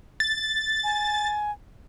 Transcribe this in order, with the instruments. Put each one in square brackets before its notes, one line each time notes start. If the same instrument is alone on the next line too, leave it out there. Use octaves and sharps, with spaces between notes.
[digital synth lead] A6
[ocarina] G#5